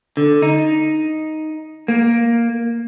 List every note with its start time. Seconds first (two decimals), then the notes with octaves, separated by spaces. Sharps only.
0.17 D3
0.42 D#4
1.88 A#3